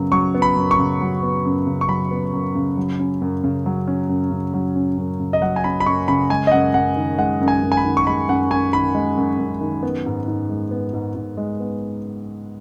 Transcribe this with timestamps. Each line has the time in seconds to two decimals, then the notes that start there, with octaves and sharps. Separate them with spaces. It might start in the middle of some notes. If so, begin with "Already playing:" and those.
Already playing: F#2 C#3 F#3 B3
0.12 F#3 C#6
0.34 B3
0.42 B5
0.56 F#2
0.71 C#6
0.79 C#3
1.01 F#3
1.23 B3
1.45 F#2
1.67 C#3
1.81 C#6
1.88 F#3 B5
2.11 B3
2.33 F#2
2.55 C#3
2.77 F#3
2.99 C#4
3.22 F#2
3.44 C#3
3.66 F#3
3.87 C#4
4.09 F#2
4.31 C#3
4.54 F#3
4.76 C#4
4.97 F#2
5.20 C#3
5.33 D#5
5.41 F#3 F#5
5.56 G#5
5.64 C#4 B5
5.80 B5
5.86 F#2 C#6
6.08 C#3 B5
6.30 G#3 G#5
6.47 D#5
6.52 F#2 F#5
6.74 F#2 F#5
6.96 D#3
7.18 G#3 F#5
7.41 F#2
7.48 G#5
7.63 F#2
7.72 G#5
7.77 B5
7.85 D#3
7.97 C#6
8.07 G#3 B5
8.28 F#2 F#5
8.51 F#2 G#5
8.73 D#3 B5
8.95 G#3
9.17 F#2
9.38 F#2
9.61 D#3
9.83 B3
10.06 G#2
10.28 G#2
10.49 G#3
10.71 B3
10.93 G#2
11.15 G#2
11.37 G#3
11.60 B3